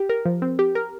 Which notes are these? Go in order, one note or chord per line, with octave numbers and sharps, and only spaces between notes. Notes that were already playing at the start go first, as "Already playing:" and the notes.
Already playing: G4
A#4
F3
C4
G4
A#4